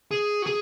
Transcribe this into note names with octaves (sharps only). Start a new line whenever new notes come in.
G#4
F#4
G#4